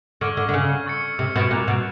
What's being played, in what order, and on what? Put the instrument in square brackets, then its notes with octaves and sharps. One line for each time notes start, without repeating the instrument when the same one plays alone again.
[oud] D3 [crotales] C#6 F6 G#6
[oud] D3
D3
C#3
[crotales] C#6 E6 A6 C#7
[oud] C3
B2
[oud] A#2 [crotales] D6 F#6 A6 C#7 F7
[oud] B2